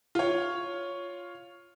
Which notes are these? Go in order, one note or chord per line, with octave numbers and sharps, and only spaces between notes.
F4 C#5